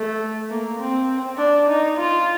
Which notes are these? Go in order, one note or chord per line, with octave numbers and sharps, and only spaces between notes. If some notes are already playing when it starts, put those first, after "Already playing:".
Already playing: A3
A#3
C4
D4
D#4
F4